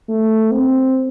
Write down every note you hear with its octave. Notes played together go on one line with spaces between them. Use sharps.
A3
C4